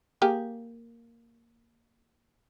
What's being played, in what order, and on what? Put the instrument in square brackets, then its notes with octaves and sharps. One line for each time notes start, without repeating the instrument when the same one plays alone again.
[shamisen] A#3 G4 G#4